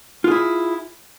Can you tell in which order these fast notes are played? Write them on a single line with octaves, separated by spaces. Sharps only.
F4 G#4 E4